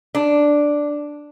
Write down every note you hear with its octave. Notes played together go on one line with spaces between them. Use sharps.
D4